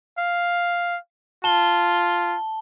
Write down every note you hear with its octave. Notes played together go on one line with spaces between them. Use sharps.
F5
F4 A5 G7